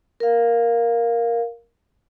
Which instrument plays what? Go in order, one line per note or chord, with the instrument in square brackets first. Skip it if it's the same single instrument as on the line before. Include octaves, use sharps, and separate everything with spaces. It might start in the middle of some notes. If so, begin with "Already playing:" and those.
[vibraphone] A#4 F5